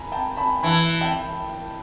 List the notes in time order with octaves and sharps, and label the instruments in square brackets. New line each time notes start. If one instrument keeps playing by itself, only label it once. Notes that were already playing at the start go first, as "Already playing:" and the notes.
Already playing: [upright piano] G#5 A#5 B5
G5 A5
A5 B5
[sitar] E3 [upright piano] A5 B5
[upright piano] G5 A5